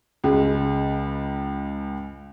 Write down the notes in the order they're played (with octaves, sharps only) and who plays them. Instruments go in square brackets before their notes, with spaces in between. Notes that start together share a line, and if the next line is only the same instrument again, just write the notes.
[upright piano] C#2 C#3 G#3